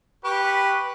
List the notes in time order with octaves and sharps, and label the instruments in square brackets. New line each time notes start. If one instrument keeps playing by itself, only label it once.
[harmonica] G4 C#6 [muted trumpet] B4